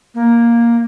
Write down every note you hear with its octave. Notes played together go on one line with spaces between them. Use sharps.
A#3